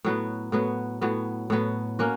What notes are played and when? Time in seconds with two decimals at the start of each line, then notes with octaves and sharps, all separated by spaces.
0.05 A2 F#3 B3
0.52 A2 F#3 B3
1.01 A2 F#3 B3
1.50 A2 F#3 B3
1.99 A#3 C#4 F#4